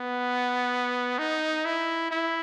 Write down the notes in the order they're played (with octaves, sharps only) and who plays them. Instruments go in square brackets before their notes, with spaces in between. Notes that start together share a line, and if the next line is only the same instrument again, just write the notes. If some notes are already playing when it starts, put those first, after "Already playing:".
Already playing: [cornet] B3
D#4
E4
E4